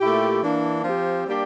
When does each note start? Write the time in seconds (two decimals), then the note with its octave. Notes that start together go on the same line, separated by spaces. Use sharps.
0.01 A#2 A3 E4 G4
0.42 E3 A#3 D4
0.84 F3 C4 G4
1.26 G3 A#3 D4 G4